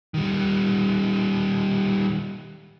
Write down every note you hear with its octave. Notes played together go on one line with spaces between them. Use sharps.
D#3 G3